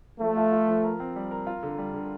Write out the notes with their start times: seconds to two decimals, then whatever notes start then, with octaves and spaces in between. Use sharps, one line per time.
0.20 F3 A3
0.36 F4
0.52 F4
0.68 F3
0.84 A#4
1.00 C4
1.16 G3
1.31 A#4
1.47 F4
1.63 D3
1.78 G3
1.94 D3